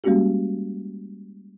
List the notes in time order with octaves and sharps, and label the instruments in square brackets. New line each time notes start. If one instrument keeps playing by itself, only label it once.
[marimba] G3 G#3 A#3 C#4 F#4 G4